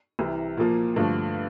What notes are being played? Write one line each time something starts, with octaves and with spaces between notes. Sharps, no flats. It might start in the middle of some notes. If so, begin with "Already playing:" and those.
C2 C3 E3
A#2 F3 A#3
G2 D3 F3 A3